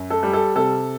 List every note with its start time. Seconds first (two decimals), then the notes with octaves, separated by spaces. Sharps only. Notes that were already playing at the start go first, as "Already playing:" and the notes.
Already playing: F#2
0.10 A4
0.23 G3
0.33 A4
0.56 C3 A4